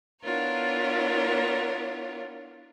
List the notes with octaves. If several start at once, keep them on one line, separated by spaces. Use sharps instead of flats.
B3 D4 E4 F4 A#4 C#5